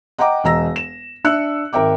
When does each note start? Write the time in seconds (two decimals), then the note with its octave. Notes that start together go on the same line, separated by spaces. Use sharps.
0.18 D#5 F#5 G5 A#5 D6
0.44 E1 D#5 A#5 E6 A#6
0.76 E7
1.24 D4 E5 E6 F#6 C#7
1.73 G#1 A#4 E5 G5 D6